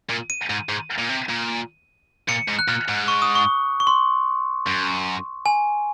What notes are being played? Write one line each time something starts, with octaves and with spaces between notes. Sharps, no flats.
A#2
D#7
G#2
G#2
A#2
C3
A#2
A#2 C#7
G#2
F#6
A#2 F6
G#2
C#6
D#6
C#6
C#6
C6
F#2
G#5